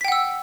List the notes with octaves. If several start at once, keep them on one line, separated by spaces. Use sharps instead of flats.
F#5 G5 E6 B6